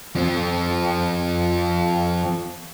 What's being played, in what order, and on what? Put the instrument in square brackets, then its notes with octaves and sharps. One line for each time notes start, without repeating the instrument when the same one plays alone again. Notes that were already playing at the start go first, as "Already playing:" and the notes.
[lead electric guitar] F3 C4